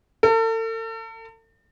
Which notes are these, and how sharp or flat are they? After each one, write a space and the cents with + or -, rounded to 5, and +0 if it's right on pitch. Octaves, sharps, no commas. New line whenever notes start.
A4 +40